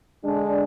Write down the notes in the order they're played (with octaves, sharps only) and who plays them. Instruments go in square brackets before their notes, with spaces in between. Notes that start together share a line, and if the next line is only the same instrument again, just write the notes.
[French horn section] D3 G#3 D4